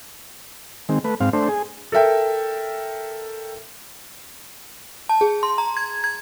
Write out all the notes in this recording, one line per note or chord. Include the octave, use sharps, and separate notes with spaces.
D#3 G#3 C4
A3 B4
G#2 C4 F5
A3 D4 C5
G#4
A4 A#4 E5 G5
A5
G#4
C6
A#5
G#6
G#6